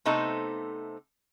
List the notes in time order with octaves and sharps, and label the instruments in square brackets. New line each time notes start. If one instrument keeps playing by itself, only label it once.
[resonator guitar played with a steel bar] C3 A3 B3 D#4 A4 C5